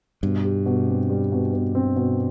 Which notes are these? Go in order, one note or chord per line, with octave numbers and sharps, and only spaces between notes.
G2 B2
G4
B2
C4
G3
B2
B2
C4
B2